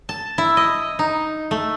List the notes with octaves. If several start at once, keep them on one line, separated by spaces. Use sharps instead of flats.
A5
E4
D#5
D#4
A3